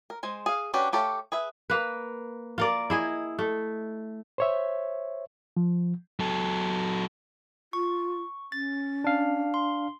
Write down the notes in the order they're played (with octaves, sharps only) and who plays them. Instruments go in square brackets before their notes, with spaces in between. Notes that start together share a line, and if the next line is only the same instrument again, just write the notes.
[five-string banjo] A#4
G#3 C5 G#5
G#4 F5
C#4 D4 F#4 G4 B4
A3 G4 A4 C#5 F5
G#4 B4 E5
[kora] A#3 B4
F4 A#4 D5
E4 G#4 D#5
A3
[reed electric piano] C5 C#5 E5
F3
[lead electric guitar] F#3 A4
[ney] F4 [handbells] C#6
[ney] C#4 [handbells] A6
[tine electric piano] D4 F5
[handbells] C6